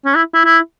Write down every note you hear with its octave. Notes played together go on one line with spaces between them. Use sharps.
C#4
E4
E4
E4